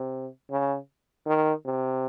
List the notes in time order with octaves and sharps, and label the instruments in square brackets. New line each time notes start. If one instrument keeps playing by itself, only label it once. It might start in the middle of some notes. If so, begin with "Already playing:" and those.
Already playing: [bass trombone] C3
C#3
D#3
C3